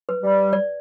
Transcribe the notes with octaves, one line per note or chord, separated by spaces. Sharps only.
B4
G3
D5